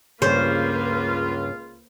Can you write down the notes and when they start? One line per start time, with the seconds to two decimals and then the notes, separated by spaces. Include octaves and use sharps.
0.22 C#2 G2 C#3 A#3 F4 B4 C5